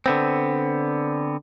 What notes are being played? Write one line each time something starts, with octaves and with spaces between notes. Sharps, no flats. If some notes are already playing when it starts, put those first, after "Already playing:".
D3 B3 C4